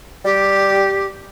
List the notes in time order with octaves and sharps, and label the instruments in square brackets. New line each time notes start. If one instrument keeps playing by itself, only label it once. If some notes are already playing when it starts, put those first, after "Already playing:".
[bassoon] G3 [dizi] G4